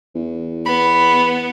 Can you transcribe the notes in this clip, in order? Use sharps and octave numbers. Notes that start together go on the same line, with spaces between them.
E2
B3 B5